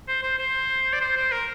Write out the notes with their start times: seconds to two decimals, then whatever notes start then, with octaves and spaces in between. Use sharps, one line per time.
0.08 C5
0.23 C5
0.39 C5
0.93 D5
1.01 C5
1.17 C5
1.32 A#4